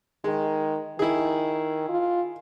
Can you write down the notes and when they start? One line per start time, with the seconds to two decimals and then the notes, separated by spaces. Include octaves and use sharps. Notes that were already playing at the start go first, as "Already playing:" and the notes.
0.24 D#3 G#3
0.99 D#3 E4 G#4
1.89 F4